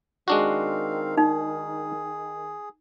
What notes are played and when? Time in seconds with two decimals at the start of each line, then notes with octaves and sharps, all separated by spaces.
0.28 D#3 G#3 C4 D4 F#4 F5
1.17 D#4 G#4